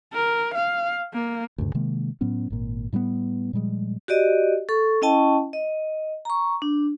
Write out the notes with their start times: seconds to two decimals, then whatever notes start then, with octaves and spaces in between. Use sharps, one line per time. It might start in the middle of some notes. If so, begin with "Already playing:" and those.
0.14 A#4
0.55 F5
1.14 A#3
1.58 D2 G2 C#3
1.74 C3 D#3 G#3 A#3
2.21 A2 F#3 B3 C#4
2.50 G#1 A#2
2.93 A2 G3 A#3 B3
3.53 A#2 F3 G3 G#3
4.08 F#4 G4 D5 D#5
4.69 A4 C#6
5.02 C#4 E4 D#5 G5 A5 C#6
5.53 D#5
6.25 A#5 C#6
6.62 D4